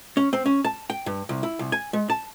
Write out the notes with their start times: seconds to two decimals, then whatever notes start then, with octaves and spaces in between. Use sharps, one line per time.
0.17 C#4
0.33 C4
0.46 C#4
0.65 A5
0.90 G5
1.06 G2
1.29 C2
1.43 E4
1.59 C2
1.72 G#5
1.93 G#3
2.10 A5